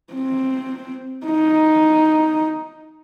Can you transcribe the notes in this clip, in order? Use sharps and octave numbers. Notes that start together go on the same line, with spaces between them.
C4
D#4